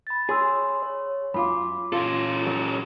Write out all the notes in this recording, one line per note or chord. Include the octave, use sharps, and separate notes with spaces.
B5 A6
G#4 C#5 C6 E6
C#5
F#2 F4 B5 D6
C#4 F4 A4
F#3